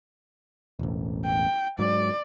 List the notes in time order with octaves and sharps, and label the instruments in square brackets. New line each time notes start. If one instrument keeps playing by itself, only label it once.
[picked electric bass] E1 A1
[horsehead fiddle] G5
[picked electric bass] G#2 F#3 [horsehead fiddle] D5